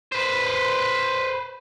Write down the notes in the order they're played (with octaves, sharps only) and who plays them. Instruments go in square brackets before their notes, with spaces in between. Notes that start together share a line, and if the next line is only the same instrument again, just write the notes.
[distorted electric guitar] B4 C5